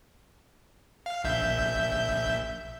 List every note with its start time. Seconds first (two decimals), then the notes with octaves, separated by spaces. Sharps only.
1.06 F5
1.24 A#1 E5 G6